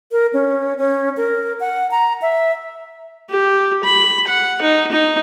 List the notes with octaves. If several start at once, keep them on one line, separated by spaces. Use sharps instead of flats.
A#4
C#4
C#4
A#4
F#5
A#5
E5
G4
B5
F#5
D#4
D#4